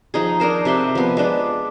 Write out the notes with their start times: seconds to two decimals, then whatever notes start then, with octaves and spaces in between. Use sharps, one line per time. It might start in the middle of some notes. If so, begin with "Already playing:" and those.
0.14 F3 D#4 G#4
0.40 D4 G#4 A#4 C5
0.65 C3 E5 F#5 C6
0.95 F3 B3
1.17 G#3 B3 D4 B4